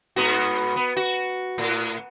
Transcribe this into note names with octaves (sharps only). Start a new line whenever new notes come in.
G#2 B3 F#4
B3
F#4
A2